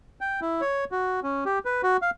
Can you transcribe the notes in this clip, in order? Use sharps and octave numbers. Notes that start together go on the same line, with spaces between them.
G5
E4
C#5
F#4
C#4
G4
B4
F#4
F5